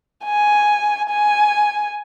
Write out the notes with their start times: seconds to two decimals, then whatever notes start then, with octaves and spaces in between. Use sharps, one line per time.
0.25 G#5
1.10 G#5